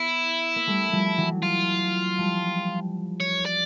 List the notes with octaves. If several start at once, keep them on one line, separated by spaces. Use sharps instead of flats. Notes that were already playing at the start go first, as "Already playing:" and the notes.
Already playing: B3 E4
A#3
G3 A3
F3 G3
E3 F#3
F4
F3 G3
C#5
D5